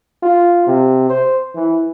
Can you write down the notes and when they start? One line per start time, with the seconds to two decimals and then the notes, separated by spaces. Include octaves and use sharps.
0.23 F4
0.67 C3
1.10 C5
1.55 E3